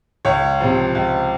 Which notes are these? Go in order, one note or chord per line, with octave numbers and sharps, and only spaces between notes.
C#2 C#5
C3 F3
C#2